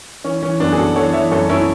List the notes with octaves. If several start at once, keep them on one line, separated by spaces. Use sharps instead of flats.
E3 C#4
E3 C#4
F#2 B3 D4
G#4
F#2 F#4 A4
E3 A4 C#5
E3 C#5 E5
F#2 A4 C#5
F#2 C#4 E4